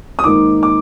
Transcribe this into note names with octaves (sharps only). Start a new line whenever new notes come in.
D#6
G#2 D#3 A#3 D#4 D6
D6